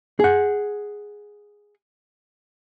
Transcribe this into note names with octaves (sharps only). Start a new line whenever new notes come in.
G#4 F#5